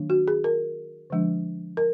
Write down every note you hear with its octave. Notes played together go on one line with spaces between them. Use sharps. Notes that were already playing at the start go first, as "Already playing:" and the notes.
Already playing: D#3 F#3 A#3 D4
F#4
G#4
A#4
D3 F3 G#3 D4
A#4